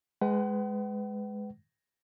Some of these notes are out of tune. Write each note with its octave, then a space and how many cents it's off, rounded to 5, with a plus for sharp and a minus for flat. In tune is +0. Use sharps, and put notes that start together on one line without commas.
G#3 +0 B4 +25 F#5 +45